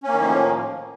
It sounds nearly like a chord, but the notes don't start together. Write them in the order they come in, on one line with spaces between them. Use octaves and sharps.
C#4 A#3 D#3 A2 F3